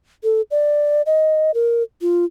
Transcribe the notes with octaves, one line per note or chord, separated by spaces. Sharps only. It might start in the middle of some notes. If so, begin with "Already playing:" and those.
A4
D5
D#5
A#4
F4